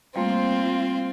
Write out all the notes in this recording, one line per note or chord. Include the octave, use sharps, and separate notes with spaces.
G3 A3 A#3 C4 F4